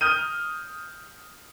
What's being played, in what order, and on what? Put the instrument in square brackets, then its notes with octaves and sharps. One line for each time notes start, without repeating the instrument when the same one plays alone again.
[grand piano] D#6 F6 G6 D#7